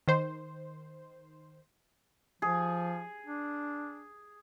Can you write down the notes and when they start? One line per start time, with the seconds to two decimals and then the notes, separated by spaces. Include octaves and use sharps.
0.08 D#3 C5
2.42 F3 G#4
3.27 D4